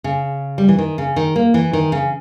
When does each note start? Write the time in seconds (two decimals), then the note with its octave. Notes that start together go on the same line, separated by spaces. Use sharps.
0.04 C#3
0.58 G3
0.68 E3
0.78 D#3
0.98 C#3
1.16 D#3
1.36 A#3
1.54 E3
1.73 D#3
1.92 C#3